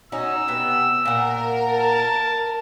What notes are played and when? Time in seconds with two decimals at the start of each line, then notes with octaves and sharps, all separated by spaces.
0.12 C#4 D#4 F#4 E6
0.48 C3 B3
1.05 A#2 A#4 F#5
1.67 A5